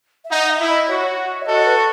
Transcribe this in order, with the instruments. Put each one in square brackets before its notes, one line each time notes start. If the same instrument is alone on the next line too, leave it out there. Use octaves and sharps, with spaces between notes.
[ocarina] E5
[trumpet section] D#4 [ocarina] F#5
[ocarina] E5
[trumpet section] E4
[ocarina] D#5
[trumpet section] F#4 [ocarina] C#5
[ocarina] E5
[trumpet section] F#4 A4 [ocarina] D#5
[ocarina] B4